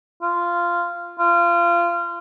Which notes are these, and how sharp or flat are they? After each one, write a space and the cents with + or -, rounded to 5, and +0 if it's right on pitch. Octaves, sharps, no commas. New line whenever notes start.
F4 -10
F4 -25